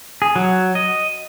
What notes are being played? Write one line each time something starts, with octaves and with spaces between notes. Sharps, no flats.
G#4
F#3
D#5